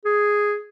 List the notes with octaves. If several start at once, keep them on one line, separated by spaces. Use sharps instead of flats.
G#4